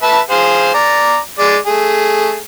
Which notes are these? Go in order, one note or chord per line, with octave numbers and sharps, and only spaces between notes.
B4 E5 A5
G#4 C5 F5
D5 A#5
G#3 D5
A3 G#4